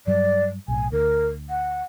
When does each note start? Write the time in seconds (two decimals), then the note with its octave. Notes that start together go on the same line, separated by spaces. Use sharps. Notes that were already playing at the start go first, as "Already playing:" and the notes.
0.07 G2 F#3 G3 D5
0.68 B1 A2 G#5
0.92 D2 A#4
1.49 F#5